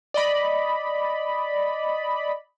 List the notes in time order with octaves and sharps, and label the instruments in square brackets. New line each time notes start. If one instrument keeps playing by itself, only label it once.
[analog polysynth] D5 D#5 B5